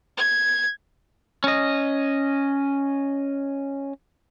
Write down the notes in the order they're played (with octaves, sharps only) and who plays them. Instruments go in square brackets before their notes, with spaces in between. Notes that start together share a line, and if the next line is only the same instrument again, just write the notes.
[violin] G#6
[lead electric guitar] C#4 D#5